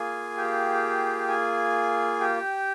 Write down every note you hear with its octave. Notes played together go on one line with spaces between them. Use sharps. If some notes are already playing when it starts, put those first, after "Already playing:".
Already playing: A#3 F4 G#4 G#5
G4 G5
G#4 G#5
G4 G5